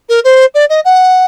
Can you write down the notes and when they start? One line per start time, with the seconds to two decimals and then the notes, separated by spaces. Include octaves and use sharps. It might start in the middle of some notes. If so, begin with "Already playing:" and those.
0.09 A#4
0.24 C5
0.54 D5
0.69 D#5
0.85 F#5